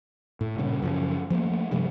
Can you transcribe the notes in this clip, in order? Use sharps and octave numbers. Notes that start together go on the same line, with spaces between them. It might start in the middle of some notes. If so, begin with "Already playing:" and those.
A2
G2 A#2 C#3
F#2 C#3 F3
F3 F#3 A3 A#3
G2 C3 F3 G#3